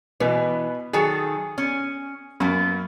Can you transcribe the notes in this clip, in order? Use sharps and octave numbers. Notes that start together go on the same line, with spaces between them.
B2 E3 B3
D#3 F#3 G#4 A4
C#4
F#2 A#3 B3